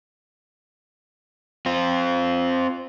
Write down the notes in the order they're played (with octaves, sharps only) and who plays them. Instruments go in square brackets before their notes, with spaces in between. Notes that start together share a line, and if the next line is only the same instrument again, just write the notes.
[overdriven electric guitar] C4 F4